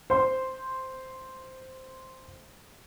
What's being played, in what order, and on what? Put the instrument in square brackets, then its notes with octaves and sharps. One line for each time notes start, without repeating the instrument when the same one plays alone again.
[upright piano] C5 C6